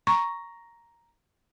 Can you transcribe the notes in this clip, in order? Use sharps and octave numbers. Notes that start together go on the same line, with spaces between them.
A#5 C#6